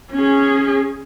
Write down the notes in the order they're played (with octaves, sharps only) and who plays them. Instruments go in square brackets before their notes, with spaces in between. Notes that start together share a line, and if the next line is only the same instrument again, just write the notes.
[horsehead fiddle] C#4 G#4